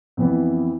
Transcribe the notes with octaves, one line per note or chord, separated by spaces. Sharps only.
F2 E3 B3 E4